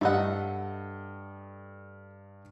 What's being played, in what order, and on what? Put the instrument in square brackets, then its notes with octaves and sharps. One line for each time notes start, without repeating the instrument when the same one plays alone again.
[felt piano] G2 D#5 [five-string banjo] A3 A4 F#5